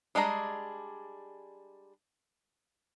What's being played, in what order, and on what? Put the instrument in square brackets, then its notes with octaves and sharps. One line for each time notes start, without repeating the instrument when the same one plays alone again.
[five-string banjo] G3 G#3 D4 G#4 A#5